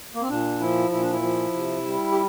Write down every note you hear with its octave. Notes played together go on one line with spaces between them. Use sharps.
A#3
C4
A#2 D4
F3 E4
A#2 E4
D4
E4
F3
C3
G3
G4